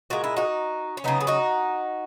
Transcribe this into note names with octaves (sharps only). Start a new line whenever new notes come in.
A#2 G#3 F#4
E4
D#4 F#4
C#4
C#3 F#3 B3 D#4
G#4
D#4 F#4